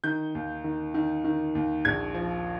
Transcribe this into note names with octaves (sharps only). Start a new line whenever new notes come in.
D#3 G6
D#2
D#3
D#3
D#3
D#2
A#1 G#6
F3